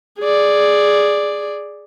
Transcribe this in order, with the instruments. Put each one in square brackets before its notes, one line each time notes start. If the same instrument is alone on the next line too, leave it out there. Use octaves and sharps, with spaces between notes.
[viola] G#4 D5